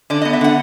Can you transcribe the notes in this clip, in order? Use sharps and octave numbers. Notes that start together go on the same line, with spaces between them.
D3 D5
B3 D#5
E5
D3 F#5